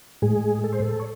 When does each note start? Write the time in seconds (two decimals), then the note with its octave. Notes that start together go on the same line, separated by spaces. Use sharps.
0.22 A2 G#3 G#4
0.64 A4
0.72 C5
0.82 A4
1.00 C#5